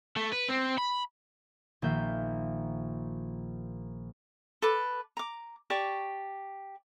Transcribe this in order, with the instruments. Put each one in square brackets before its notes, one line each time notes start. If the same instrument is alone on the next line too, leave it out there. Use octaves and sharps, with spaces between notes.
[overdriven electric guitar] A3
B4
C4
B5
[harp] A#1 D#3 A#3 F4 E5 G6
[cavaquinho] A4 B4 D6
A#5 D6
G4 D5 A5 C#6